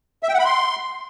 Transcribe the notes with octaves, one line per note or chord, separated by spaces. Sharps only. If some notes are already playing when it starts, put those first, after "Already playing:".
E5
G5
F#5
B5
C6